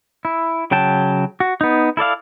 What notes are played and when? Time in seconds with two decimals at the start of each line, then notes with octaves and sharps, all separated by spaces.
0.25 E4
0.71 C#3 F#3 G5 A5
1.40 F#4
1.61 B3 D#4
1.97 E4 A4 D5 F5